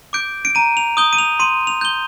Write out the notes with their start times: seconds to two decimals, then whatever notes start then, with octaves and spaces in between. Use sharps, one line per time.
0.13 D6 G6 D7
0.45 D7
0.55 A#5 D#7
0.77 F7
0.97 D#6 G6 G7
1.13 D#7
1.18 F7
1.40 C6 D#7
1.67 F7
1.81 G6 G7